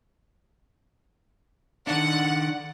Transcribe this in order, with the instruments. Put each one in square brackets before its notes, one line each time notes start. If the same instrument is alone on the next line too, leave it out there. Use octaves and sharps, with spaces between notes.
[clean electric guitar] D#3 D4 [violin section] F#5